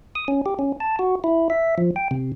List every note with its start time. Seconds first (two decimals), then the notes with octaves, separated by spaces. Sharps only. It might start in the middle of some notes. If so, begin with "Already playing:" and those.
0.15 D#6
0.28 C#4
0.46 G4
0.59 C#4
0.80 A5
0.99 F#4
1.24 E4
1.50 E5
1.78 F3
1.96 G5
2.11 C3